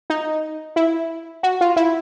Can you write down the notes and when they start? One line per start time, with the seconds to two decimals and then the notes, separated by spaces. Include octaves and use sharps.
0.10 D#4
0.76 E4
1.43 F#4
1.61 F4
1.76 E4